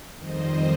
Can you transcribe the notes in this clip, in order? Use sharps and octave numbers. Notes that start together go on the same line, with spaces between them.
F2 D#3 G3 C5 D#5